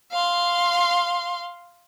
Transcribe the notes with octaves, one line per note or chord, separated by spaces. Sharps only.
F5 C6